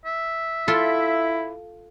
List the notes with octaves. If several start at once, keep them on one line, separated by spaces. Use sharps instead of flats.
E5
E4 F4 A4 C6